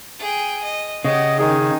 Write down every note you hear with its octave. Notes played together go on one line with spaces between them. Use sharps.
G#4 G5
D#5
C#3 G4 D#5 F#5
D#3 G#4 G#5